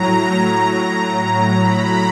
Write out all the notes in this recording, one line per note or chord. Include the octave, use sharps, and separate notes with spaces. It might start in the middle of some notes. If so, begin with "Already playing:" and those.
Already playing: A2 F#3 A#5
B5